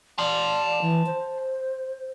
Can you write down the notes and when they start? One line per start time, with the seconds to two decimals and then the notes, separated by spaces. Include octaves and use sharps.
0.19 D5 A5 C6
0.81 E3
1.06 C5